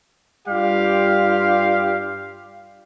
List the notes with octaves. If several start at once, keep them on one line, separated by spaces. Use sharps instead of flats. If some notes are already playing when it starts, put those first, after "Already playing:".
G2 G3 F4 G4 F5